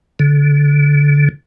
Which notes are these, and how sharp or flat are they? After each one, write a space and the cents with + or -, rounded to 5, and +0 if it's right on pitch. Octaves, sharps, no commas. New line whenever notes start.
D3 -25